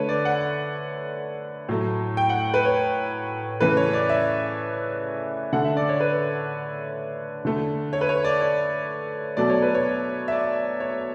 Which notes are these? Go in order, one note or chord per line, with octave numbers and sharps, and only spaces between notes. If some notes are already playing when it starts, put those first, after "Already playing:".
Already playing: D3 A3 B4 C#5
D5
F#5
A2 F#3 A3
G5
F#5
B4
C#5
C#3 E3 A3 B4
C#5
D5
E5
D3 A3 F#5
E5
D5
C#5
B4
D3 A3
C#5
B4
C#5
D5
C#5
B2 F#3 A3 D5
C#5
B4
C#5
E5
D5
C#5